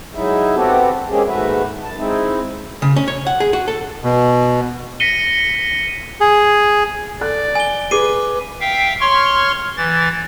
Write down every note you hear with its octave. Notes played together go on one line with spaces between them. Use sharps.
F#3 G#3 D#4 E4 E5
B3 C4 F#4 G4 A4
G#3 A#3 C4 C#4 G4 G#4
D#2 G#2 A3 F#4 B4 E5
F#2 A5
G#3 C4 D#4 E4
C#3
C#4
C#5
F#5
G#4
F#4
A4
B2
A#6 B6 C#7 D#7 G7
G#4
A4 D5 F#6
G#5 G7
G#4 B4 D6 C7 D#7
E5 F5 G5
C#5 C6 C#6 F6
E3 A6